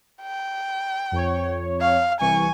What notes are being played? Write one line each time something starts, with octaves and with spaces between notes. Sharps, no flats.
G5
F2 C#5
F5
C2 E3 G#5 C#6